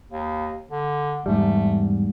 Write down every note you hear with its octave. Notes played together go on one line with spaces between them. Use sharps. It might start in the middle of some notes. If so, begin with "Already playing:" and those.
D#2
D3
E2 G#2 G3 A3